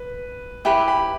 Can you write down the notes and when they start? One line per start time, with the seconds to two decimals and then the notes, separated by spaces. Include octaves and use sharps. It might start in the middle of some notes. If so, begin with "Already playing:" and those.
Already playing: B4
0.65 E4 G4 B4 G5 B5
0.88 G5 B5